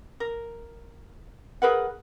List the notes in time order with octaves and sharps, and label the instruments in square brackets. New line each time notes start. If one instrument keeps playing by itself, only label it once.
[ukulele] A#4
G#4 A#4 B4 F#5